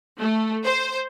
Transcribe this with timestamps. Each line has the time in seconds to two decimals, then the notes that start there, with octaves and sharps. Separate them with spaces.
0.19 A3
0.64 C5